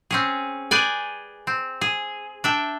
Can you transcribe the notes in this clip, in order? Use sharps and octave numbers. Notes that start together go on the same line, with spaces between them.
C4 C#4 G#4
G#4 B4 D5 G5 G#5
C4
G#4
D4 E5 G5